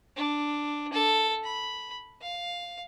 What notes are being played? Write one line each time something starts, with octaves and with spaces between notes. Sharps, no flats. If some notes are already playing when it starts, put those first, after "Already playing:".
D4
A4
B5
F5